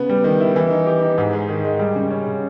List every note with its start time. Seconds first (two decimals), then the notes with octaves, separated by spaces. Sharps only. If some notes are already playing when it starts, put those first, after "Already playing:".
Already playing: C#3 B3
0.09 G3
0.24 D#3
0.40 E4
0.56 E3
0.70 D#4
0.86 G4
1.02 D#4
1.18 G#2
1.33 G#3
1.49 D#3
1.65 G#3
1.79 G3
1.95 C#3
2.10 C#4
2.26 C#3